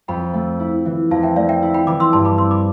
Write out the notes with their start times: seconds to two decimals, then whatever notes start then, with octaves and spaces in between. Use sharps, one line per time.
0.08 F2 G5 B5
0.34 A3
0.60 E4
0.85 E3
1.11 F2 F5 A5
1.23 E5 G5
1.36 A3 D5 F5
1.49 E5 G5
1.62 E4
1.74 G5 B5
1.87 E3 B5 D6
2.00 C6 E6
2.13 G2 A5 C6
2.25 B5 D6
2.38 C4 C6 E6
2.51 B5 D6